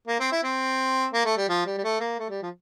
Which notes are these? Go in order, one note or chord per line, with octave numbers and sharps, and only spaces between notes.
A#3
C4
E4
C4
A#3
A3
G3
F3
G3
G3
A3
A#3
A3
G3
F3